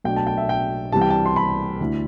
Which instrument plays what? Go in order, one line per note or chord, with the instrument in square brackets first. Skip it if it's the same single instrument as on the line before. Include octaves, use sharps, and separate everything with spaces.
[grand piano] B1 B2 A3 D4 G5
A5
G5
E5
G5
C2 C3 E3 G3 A5
G5
A5
C6
B5
D2 D3 A3 E4